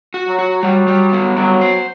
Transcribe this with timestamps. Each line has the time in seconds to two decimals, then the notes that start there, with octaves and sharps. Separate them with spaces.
0.14 F#4
0.27 F#3
0.39 F#4
0.63 F#3 G3
0.87 G3
1.13 B3
1.37 F#3 G3
1.61 C5